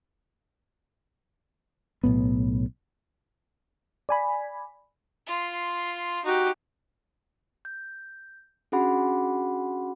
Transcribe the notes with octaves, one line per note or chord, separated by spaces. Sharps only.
B1 A2 B3
D5 G#5 B5
F4 C6
D#4 F#4 G4
G6
C#4 D4 F#4 G#4 F#5 B5